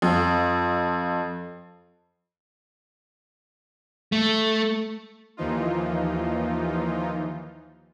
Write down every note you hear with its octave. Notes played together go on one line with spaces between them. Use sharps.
F2
A3
D#2 E3 F3 D#4 F4